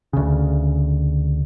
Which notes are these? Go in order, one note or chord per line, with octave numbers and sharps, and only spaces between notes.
D2 C#3